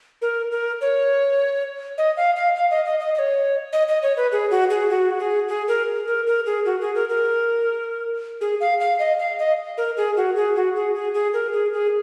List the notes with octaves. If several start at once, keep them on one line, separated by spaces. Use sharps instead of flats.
A#4
A#4
C#5
D#5
F5
F5
F5
D#5
D#5
D#5
D#5
C#5
D#5
D#5
C#5
B4
G#4
F#4
G#4
F#4
G#4
G#4
A#4
A#4
A#4
G#4
F#4
G#4
A#4
A#4
G#4
F5
F5
D#5
F5
D#5
A#4
G#4
F#4
G#4
F#4
G#4
G#4
G#4
A#4
G#4
G#4